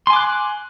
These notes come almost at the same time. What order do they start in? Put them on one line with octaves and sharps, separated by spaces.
C6 G#5 D6 F#6